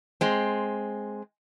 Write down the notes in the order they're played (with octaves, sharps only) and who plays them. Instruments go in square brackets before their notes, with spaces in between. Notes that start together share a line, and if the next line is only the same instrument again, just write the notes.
[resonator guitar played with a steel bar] G#3 C4